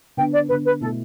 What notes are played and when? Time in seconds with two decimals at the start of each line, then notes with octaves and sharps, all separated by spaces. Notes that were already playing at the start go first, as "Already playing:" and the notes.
0.17 D3 B3 D4 G5
0.33 D5
0.48 D3 B3 D4 B4
0.65 B4
0.81 B2 A3 E4 A4